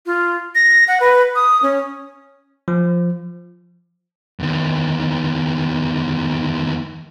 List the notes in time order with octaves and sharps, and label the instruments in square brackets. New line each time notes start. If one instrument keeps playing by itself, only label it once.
[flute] F4
A#6
F#5
B4
D#6
C#4
[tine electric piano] F3
[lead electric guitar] E2 D#3